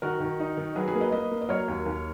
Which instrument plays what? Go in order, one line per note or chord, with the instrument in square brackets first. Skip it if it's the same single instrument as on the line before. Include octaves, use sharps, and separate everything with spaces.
[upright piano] D#3 [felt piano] F#4 A#4
[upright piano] D#3
D#4
D#3
[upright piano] F#3 [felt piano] G#4 B4
[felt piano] G#4 B4
[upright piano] A#3
[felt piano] B4 D#5
[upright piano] A#3 [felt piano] B4 D#5
[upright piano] A#3
[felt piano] D#5
[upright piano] F#3 [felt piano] A#4 C#5
[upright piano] D#2
D#2